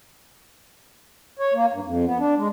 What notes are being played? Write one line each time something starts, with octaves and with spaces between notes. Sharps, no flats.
C#5
A#3
G2
F2
B3
D4
G#3